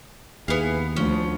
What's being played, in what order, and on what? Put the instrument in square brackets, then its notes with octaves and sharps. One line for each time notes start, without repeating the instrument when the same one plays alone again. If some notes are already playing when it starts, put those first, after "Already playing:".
[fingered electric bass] D#2 [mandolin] B3 F5 [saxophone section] E4 G#4
[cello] D2 [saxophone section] F3 [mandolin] C#4